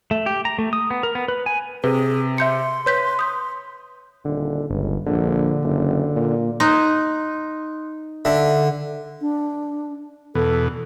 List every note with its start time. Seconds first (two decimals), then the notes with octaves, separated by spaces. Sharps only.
0.11 A3
0.26 G4
0.45 A#5
0.59 A3
0.73 D#6
0.91 B3
1.03 A#4
1.15 B3
1.28 B4
1.46 G#5
1.84 C3 G#4 B4
2.38 E5 C6 G6 C#7
2.86 B4 C#5 G6 B6
3.19 D#6 G6
4.25 D#1 D3
4.70 G1 C#2
5.06 A#1 D3
5.64 F#1
6.16 A#2
6.60 D#4 C6 D#6 F#6
8.25 D3 E5
9.21 D4
10.35 E2 B2 A4